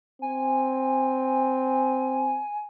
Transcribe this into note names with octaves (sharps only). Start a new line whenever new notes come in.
C4 G#5